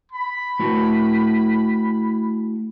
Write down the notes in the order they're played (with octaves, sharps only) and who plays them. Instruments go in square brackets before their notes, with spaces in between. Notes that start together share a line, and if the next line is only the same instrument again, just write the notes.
[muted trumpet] B5
[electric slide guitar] A3 E4 F#4